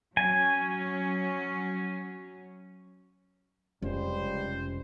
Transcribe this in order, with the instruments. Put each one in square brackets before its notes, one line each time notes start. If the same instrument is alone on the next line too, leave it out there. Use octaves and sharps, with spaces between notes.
[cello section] F#3 C#4 [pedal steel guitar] G#5
[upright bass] F1 [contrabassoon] C#2 [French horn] G3 [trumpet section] C5